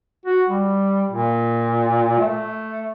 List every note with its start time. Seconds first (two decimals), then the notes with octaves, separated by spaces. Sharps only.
0.26 F#4
0.49 G3
1.11 A#2
2.18 A3